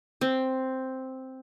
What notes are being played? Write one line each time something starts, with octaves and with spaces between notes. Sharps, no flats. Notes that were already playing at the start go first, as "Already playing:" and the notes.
C4